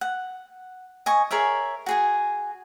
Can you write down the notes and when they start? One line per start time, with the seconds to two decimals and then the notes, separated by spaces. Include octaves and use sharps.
0.01 F#5
1.06 D#5 G#5 C#6
1.31 G#4 A#4 C#5 E5
1.86 F#4 G#4 G#5